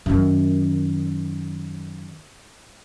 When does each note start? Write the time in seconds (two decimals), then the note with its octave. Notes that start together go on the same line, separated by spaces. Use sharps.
0.06 F#2 D#3